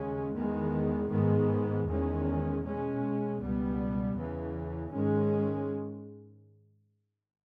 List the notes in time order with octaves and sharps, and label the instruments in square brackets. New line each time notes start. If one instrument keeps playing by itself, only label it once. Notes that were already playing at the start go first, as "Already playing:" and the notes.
Already playing: [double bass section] D#2 C#3 G#3 C#4
E2 D#3 G#3 B3
G#2 D#3 G#3 B3
E2 D#3 G#3 C#4
B2 G#3 C#4
C#2 B2 G3 B3
E2 C#3 E3
G#2 D#3 G#3 C#4